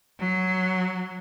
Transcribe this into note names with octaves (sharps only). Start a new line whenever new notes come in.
F#3